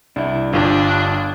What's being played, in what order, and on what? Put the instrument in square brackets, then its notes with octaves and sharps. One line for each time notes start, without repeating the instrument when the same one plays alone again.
[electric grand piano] C2 [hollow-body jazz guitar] D4 E4
[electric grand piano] G1 G2 [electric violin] D4 [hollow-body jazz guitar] F4 G4